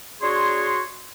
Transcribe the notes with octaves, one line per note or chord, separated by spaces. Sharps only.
D4 F#4 G#4 C#5 C6